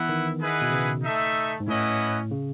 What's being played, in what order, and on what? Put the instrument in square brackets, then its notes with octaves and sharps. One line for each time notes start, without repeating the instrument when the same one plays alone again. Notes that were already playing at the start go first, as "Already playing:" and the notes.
Already playing: [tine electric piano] E3 B3 [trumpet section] E4 B4 F#5
[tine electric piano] D#3
[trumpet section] E4 G#4 B4 D#5 F#5
[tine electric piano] B2
C#3
[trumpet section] A3 D#4 A4 E5
[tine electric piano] G#2
[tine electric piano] A2 [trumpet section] C#4 E4 B4 D#5 F#5
[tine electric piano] C#3